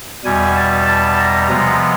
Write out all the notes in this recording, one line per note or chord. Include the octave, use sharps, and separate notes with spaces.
E2 B2 G3 G#5
A5
A5
A#5
C3 F3 G#3 B3 A#5